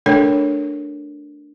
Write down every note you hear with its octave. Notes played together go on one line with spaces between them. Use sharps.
A3 D4 A4 A#4 C#5